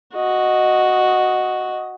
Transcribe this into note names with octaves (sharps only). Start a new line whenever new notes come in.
F#4 D#5